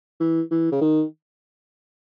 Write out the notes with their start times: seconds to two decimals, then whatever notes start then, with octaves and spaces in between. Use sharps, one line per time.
0.20 E3
0.51 E3
0.72 C#3
0.81 D#3